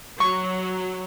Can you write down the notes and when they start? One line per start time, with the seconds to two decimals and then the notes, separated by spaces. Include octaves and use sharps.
0.20 F#3 C#6